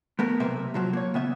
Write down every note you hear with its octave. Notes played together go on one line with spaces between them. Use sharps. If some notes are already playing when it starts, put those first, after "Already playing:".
A3 B3 A#4
B1 C3 A#3 E5
C3 F3 F#3
A#3 C#5
C#3 B3 E5